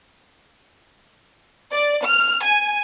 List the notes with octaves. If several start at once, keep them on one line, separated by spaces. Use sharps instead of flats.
D5
F6
G#5